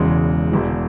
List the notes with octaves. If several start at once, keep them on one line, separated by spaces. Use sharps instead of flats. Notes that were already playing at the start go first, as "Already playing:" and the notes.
Already playing: E1 E2 C#3 G#3
E1 E2 E3